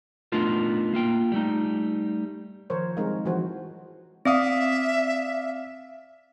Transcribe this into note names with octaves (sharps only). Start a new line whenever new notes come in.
A3 B3 D4 D#4 F4 A#4
A#3 F4 G5
G3 A3 D#4
D#3 F3 A#4 C5 C#5
G3 G#3 C4 D#4 A#4 C#5
E3 F3 G#3 F#4 C5
C4 D5 E5 F5 D#6